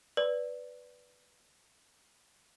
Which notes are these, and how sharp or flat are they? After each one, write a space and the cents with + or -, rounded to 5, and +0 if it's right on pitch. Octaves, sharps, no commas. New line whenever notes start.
B4 +0 D5 -5